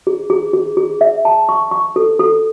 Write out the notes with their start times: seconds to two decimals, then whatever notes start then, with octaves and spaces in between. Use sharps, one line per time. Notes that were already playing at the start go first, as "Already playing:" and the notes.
0.07 G#4
0.30 G#4
0.53 G#4
0.77 G#4
1.01 E5
1.25 A5
1.49 C#6
1.71 C#6
1.96 A4
2.19 A4